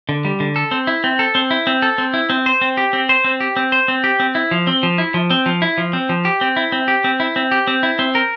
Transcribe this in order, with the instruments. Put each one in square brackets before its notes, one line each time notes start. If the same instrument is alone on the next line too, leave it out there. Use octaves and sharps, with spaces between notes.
[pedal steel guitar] D3
G3
D3
A4
C4
E4
C4
A4
C4
E4
C4
A4
C4
E4
C4
C5
C4
G4
C4
C5
C4
G4
C4
C5
C4
G4
C4
E4
F3
C4
F3
E4
F3
C4
F3
E4
F3
C4
F3
G4
C4
E4
C4
G4
C4
E4
C4
G4
C4
E4
C4
A#4